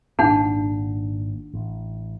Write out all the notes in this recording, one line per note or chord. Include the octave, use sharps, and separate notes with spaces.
G#1 A#2 D4 D#4 F#5
A1